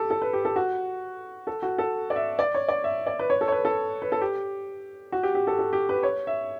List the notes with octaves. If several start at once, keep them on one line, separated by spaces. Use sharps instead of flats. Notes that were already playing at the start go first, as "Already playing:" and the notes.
Already playing: G4 A4
A4
B4
G4
A4
F#4
A4
F#4
A4
D5
E5
D5
C#5
D5
E5
D5
B4
C#5
A4
C#5
B4
A4
B4
A4
G4
F#4
G4
G4
A4
A4
G4
B4
C#5
E5